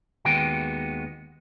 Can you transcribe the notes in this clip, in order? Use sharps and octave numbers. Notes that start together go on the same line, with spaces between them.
D#2 D#3 G#3 B3 F#4 G5